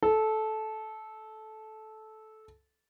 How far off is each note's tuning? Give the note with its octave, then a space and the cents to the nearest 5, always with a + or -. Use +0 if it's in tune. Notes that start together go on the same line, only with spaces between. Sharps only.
A4 -15